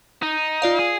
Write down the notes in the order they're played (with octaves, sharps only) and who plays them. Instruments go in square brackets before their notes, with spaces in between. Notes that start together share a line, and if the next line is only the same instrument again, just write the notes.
[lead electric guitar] D#4
[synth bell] F4 D5 F5
[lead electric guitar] G#4